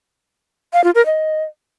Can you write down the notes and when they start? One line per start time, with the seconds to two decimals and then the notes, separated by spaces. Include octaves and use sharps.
0.73 F5
0.84 F4
0.95 A#4
1.06 D#5